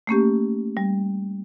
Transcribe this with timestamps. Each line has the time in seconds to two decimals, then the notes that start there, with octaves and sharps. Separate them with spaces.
0.07 A3 A#3 C#4 G4
0.77 G3